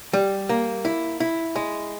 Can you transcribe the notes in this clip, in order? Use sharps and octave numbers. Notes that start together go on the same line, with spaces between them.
G3
A#3
E4
E4
G#3